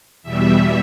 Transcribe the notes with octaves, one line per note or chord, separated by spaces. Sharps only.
E2 B2 G3 E5